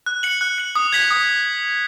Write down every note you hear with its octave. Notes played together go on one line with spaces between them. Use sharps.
F#6
C#7 F#7
F#6
C#7 F#7
D#6
G#6 B6 F#7
D#6